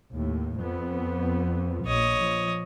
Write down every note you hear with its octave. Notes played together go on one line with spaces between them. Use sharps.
D#2 A2
F2 B3
A#1 C#5 D#5
F3